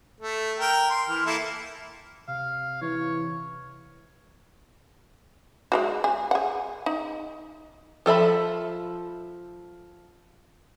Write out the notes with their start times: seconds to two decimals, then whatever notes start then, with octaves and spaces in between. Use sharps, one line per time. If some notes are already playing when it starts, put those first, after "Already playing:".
0.20 A3
0.60 A#4 G5
0.90 C6
1.08 E3 F6
1.26 A#3 E4 A4
2.28 C3 F5
2.82 E3 C#5
5.72 G#3 F4 F#4
6.04 G#4
6.31 G#4 F#5
6.86 D#4
8.06 F3 A4 E5 B5